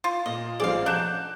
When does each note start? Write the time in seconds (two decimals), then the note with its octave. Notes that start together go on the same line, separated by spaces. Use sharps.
0.04 F4
0.26 A#2 D#5
0.60 A1 F3 G#4 D5 F5
0.86 F#3 D4 F#6 G6 E7